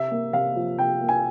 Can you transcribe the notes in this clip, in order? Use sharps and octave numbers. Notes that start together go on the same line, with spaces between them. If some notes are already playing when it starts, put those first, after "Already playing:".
Already playing: C3 E5
A#3
C3 F5
F3
C3 G5
A#3
G#5